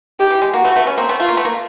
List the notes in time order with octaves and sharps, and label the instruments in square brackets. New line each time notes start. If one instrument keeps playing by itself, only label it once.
[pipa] D#3 [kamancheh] G4
[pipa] E3
G#3
[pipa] A#3 [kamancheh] F#4
[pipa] A3 B3
A3 B3
B3 C#4
A#3 C4
A3 B3
[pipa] A3 [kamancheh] F4
[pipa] A#3
A3 B3
A#3